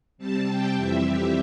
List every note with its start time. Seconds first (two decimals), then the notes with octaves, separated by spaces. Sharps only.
0.18 C3 G3 C4 A5
0.47 G5
0.75 F2 E3 G3 C4 E5
1.03 G4